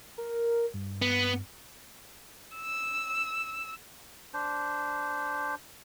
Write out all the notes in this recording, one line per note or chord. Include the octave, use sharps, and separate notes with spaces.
A#4
G2
B3
E6
D4 C5